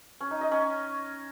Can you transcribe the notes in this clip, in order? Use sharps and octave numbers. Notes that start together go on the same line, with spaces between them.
C#4
D#4
D#5
C#4